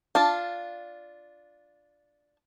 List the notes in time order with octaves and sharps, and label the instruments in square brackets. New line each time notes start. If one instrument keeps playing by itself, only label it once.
[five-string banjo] D4 F4 A5